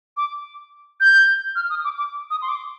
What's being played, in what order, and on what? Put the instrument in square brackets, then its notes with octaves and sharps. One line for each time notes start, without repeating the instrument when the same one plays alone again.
[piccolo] D6
G6
F6
D#6
D6
D6
D#6
C6
D6